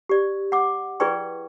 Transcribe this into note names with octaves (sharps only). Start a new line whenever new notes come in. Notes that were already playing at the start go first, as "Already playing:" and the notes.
G4 D5
F#5 D6
E4 G#4 B4 D5 G5 C#6